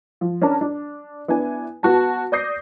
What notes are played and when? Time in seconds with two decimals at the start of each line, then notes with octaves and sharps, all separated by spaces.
0.21 F3
0.41 C#4 D4 A#4 A5 A#5
0.61 D4
1.28 B3 D4 E4 G#5
1.83 B3 F#4 A5
2.32 D5 D6 D#6 G6 A#6 C7